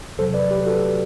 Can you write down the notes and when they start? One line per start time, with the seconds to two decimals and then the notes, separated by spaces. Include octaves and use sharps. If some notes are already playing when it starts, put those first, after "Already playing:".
0.18 E2 C3 F#3 A4 C5
0.34 B4 D5
0.51 G4 B4
0.66 F#4 A4